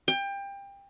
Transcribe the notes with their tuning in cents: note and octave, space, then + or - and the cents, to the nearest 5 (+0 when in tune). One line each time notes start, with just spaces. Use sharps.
G5 +25